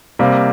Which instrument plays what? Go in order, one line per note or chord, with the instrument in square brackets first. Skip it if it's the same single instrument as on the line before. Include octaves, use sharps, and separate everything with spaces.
[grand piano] C3 G3 A#3